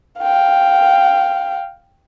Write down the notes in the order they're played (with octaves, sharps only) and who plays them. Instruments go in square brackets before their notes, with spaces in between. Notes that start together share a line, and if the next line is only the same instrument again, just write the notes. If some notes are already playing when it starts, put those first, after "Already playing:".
[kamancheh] F5 G5